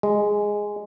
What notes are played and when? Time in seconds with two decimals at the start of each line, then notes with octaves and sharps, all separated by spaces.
0.03 G#3